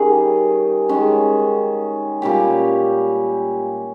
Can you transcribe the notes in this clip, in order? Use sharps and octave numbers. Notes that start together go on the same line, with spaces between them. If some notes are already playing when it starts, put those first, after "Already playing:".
Already playing: D#3 G3 C#4 G#4
D#3 G#3 C#4
A#2 G3 C#4 G4